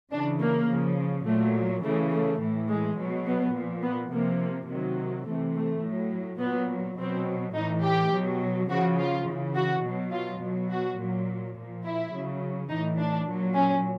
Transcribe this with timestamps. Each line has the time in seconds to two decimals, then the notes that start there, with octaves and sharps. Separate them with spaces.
0.11 C#3 E3 D4
0.40 A#3
0.68 C#3 F3
1.26 A#2 F#3 A3
1.83 C#3 E3 A3
2.12 A3
2.41 A2 E3
2.69 G#3
2.97 B2 F#3
3.26 B3
3.54 A#2 F3
3.83 B3
4.12 C3 F3 A#3
4.68 C3 D#3 F#3
5.26 C3 E3 A3
5.55 A3
5.84 A2 F#3
6.40 A#2 F#3 B3
6.98 B2 F#3 C4
7.54 A2 E3 D#4
7.83 G4
8.12 B2 F#3
8.69 C#3 F3 F#4
8.98 F4
9.27 C#3 E3
9.56 F#4
9.84 B2 F#3
10.12 F4
10.40 B2 F#3
10.70 F#4
10.98 A#2 F#3
11.56 A#2 F3
11.84 E4
12.12 C#3 F#3
12.70 E3 D#4
12.74 A2
12.98 D4
13.27 A#2 F#3
13.55 C#4